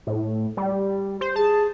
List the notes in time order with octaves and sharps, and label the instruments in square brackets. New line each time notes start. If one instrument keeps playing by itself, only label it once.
[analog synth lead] A2
G3
C5
[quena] G#4 [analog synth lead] A5